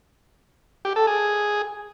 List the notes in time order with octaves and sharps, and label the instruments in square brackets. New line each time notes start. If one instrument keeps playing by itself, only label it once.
[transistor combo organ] G4
A4
G#4